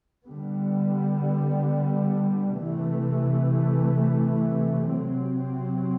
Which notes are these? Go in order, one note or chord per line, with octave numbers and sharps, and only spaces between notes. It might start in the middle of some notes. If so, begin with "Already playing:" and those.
D3 G3 B3
C3 E3 A3
C3 F#3 C4